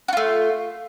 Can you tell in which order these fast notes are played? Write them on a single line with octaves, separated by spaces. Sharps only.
F#4 F4 A3